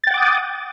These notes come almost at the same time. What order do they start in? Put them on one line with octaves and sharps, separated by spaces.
A6 G5 F#5 D6 D#6